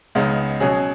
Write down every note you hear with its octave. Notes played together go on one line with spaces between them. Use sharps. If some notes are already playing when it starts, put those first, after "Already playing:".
C#2 C#3 G#3 B3 D#4
B2 F#3 C#4 G#4